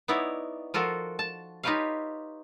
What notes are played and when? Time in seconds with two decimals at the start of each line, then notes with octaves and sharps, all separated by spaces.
0.08 B3 D#4 E4 C#5 D5
0.74 F3 F4 F#4 A4 A#4
1.19 A5
1.63 D#4 F4 G4 B4 C#5 F5